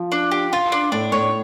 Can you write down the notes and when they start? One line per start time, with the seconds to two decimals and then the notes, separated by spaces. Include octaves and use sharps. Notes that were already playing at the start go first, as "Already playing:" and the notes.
Already playing: F3
0.12 D4
0.31 G4
0.53 F4
0.72 D4
0.92 A2 D4
1.12 A2 C#5